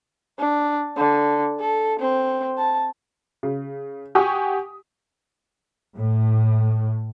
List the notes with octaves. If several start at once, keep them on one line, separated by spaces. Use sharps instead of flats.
D4
D3
A4
C4
A5
C#3
G4 F#5 G#5 C#6 D#6
A2